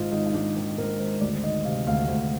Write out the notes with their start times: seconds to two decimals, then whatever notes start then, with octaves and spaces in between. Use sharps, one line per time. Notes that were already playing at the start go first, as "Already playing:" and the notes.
Already playing: G#1 G#2 D#3 F4 D#5
0.12 G#1 D#4
0.26 D#4
0.34 G#1 D4
0.56 D#3 D#4
0.78 G#2 A#4
0.99 G#1 C5
1.21 D2 D5
1.44 D#3 D#5
1.65 C3 F5
1.87 D2 F5
2.08 D2